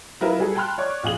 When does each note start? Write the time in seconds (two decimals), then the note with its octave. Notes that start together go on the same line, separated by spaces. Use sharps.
0.21 F#3 E4 F4 A#4 B4 D#5
0.39 G3 F#4 G#4 A4
0.55 G5 A5 B5 C6 F6 F#6
0.78 C#5 D5 C#6 D6
1.03 A#1 F2 F4 G#4 D#6 F#7